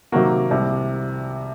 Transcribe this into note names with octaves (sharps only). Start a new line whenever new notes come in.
C3 D#3 F#3 A#3 F#4
C2 C3 G3